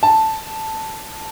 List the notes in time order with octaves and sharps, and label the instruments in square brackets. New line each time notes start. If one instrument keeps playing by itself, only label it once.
[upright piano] A5